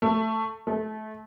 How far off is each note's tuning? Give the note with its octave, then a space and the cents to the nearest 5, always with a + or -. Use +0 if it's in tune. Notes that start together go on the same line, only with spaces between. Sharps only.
A3 +10
A3 -25